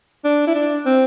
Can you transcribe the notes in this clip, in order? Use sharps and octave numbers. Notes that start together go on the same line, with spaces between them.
D4
E4
D4
C4